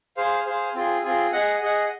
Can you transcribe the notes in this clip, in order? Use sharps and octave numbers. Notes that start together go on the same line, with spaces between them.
G#4 C5 F5
G#4 C5 F5
C4 F4 G#4
C4 F4 G#4
G#4 D#5 F#5
G#4 D#5 F#5